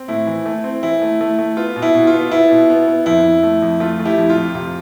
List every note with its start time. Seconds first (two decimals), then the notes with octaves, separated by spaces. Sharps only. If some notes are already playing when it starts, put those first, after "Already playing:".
Already playing: C4
0.08 A2 E4
0.27 E3
0.46 A3
0.64 C4
0.83 E3 E4
1.02 A3
1.21 A3
1.39 A3
1.57 B3 F4
1.76 B2
1.82 E4
1.95 B2
2.07 F4
2.13 B3
2.32 B3 E4
2.51 B2
2.70 B3
2.88 B3
3.06 F2 E4
3.25 F2
3.43 A3
3.62 F2
3.80 A3 F4
3.99 A3
4.05 E4 G4
4.18 F2
4.30 F4
4.37 F2
4.55 C3 F4